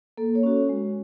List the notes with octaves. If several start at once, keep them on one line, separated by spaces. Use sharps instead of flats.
A#3 A4
C#5
C#4 F#4
G#3